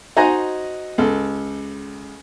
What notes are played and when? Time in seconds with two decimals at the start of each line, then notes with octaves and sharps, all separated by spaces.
0.17 D#4 F#4 C5 D#5 G#5 A#5
0.98 C#2 A4